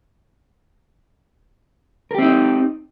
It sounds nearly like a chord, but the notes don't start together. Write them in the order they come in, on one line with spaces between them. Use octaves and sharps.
A#4 G4 C4 D#4